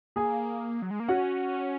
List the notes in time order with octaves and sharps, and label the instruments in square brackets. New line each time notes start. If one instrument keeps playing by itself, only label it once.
[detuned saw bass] A#3 [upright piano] G#4 G#5
[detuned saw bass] F#3
G#3
A#3
[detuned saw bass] C#4 [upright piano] F#4 F#5